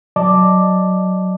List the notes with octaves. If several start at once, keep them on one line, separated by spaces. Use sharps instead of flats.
F#3 D5 D#5 A5 D6